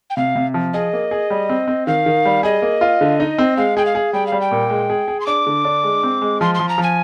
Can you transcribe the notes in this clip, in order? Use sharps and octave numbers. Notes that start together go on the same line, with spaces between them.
G5
C3 F5
C3
F3
G#4 D#5
A#3
G#4
G3
C4
C4
D#3 F5
D#3
G3
G#4 D#5
A#3
F4
D3
D#4
C4
G#3 F5
G#4 G5
F5
G#4
G3 G5
F5
G3
G5
A#2
G#3
G#4
G#4
C6
D4 D6
D3
D4
G#3
C4
G#3
F3 C6
F3 C6
A#5
F3
G#5